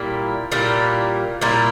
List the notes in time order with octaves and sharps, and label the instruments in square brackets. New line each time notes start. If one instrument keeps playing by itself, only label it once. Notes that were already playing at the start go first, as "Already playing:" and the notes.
Already playing: [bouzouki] A#2 G3 A#3 E4
A#2 G3 A#3 E4
A#2 G3 A#3 E4